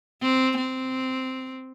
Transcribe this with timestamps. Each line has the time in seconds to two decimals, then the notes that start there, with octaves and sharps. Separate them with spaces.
0.22 C4
0.57 C4